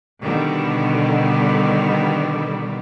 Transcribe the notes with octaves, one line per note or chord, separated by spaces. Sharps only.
B2 D3 D#3 G3 B3